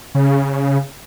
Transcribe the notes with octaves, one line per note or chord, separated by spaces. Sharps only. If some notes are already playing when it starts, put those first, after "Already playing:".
C#3